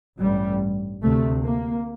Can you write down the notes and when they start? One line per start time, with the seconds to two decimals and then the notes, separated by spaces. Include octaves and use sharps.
0.19 A1 G2 G3
1.02 D2 C3 A3
1.44 A#3